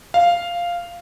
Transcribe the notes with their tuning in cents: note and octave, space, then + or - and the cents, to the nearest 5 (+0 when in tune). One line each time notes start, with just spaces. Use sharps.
F5 -5